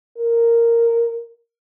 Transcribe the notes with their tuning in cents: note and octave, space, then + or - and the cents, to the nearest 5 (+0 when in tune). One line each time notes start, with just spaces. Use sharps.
A#4 -5